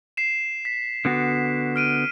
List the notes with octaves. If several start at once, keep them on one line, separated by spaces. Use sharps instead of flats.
C7 E7
B6
D3 B3 F#4
F6 D7 D#7